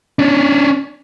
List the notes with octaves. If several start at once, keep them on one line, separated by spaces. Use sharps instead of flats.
C#4 D4